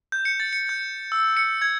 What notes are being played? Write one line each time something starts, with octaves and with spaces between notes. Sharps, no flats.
G6
C#7
A6
C#7
G6
E6
C#7
G#6